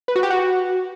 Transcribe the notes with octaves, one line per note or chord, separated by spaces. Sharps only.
B4
F#4
G4
F#4